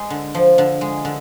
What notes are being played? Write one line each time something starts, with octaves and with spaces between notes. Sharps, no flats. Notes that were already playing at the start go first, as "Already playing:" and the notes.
Already playing: G#3
D3
F3
D3
G#3
D3